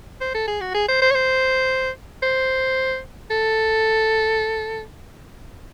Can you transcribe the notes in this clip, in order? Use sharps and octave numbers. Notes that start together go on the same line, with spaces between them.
C5
A4
G#4
F#4
G#4
C5
C5
C#5
C5
C5
A4